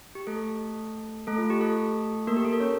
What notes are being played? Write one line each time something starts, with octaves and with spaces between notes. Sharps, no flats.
G4
A3 A4
A3 A4
F4
G4
A3 A4
A#3 A#4
G4
A4
A#4
C#4 C#5